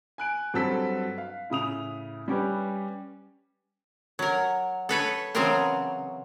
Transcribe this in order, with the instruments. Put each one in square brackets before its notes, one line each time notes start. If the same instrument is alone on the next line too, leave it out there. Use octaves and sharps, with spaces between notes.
[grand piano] G#5 F#6 D7
G2 F#3 C4 A4 E6 B6
F5
A2 C#3 D#6 F7
G3 C#4 G4 B4
[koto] F#3 A#4
A4 B4 C#5
C#3 E3 F#3 C4 A#4 C5